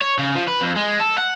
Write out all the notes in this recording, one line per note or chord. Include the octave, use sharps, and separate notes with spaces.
C#5
C#3
F3
B4
F2
G#3
A4
F#5